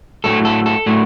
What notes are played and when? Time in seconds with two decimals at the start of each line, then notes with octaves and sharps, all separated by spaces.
0.24 A2 F#3 A3 A4
0.45 A4
0.66 A4
0.86 A2 F#3 A3